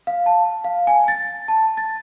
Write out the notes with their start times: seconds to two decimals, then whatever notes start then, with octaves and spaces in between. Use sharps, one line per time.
0.07 F5
0.26 A5
0.64 F5
0.87 G#5
1.08 A6
1.48 A5
1.77 A6